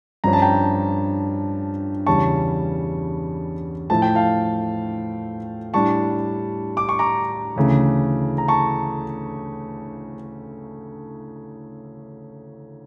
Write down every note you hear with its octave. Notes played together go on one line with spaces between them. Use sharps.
G2 F3 C#4 A#5
A5
G5 A#5
E2 C#3 G3 C#4 A5 C#6
A2 F3 A3 A5
G5
F5 A5
A2 G3 D4 A5 C#6
D6
C#6
A#5 D6
D2 C#3 E3 A3
A#5
A5 C#6